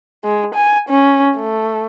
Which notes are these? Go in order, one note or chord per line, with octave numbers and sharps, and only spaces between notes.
G#3
G#5
C#4
A3